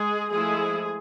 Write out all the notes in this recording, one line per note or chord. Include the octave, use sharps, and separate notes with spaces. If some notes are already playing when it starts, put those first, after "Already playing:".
Already playing: G#3 G#4
F3 G#3 A3 E4 G#4